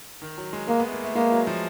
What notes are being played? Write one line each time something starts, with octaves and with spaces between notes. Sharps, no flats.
D#3
F#3
G#3
G#3 A#3
B3
A3
A#3
A3
G#3 A#3
F#3
F3